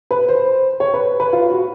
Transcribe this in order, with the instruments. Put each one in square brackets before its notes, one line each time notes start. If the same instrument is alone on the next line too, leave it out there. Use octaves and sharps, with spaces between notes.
[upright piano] B4
C5
C#5
B4
B4
F4
F#4